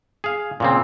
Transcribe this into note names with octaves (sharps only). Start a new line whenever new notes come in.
G#4 F5
A#2 C#3 C4